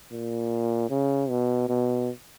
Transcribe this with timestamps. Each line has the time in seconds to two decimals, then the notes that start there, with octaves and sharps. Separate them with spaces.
0.12 A#2
0.90 C#3
1.30 B2
1.69 B2